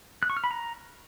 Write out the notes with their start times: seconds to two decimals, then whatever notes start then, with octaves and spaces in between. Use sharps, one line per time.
0.23 F#6
0.30 C#6
0.37 F6
0.44 B5
0.51 A#5